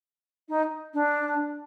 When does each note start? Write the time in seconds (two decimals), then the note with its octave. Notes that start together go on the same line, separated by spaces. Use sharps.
0.48 D#4
0.93 D4